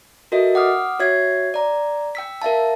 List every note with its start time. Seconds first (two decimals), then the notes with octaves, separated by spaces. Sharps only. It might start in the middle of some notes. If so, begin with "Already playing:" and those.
0.32 F#4 A4 A#4 D#5 E5
0.55 F#5 D6 D#6 F6
0.99 F#4 C#5 E5 G#6 C7
1.54 D5 A#5
2.15 G5 E6 B6
2.42 A#4 E5 F5 A5